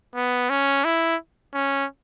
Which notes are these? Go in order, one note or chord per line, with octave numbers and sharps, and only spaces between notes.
B3
C#4
E4
C#4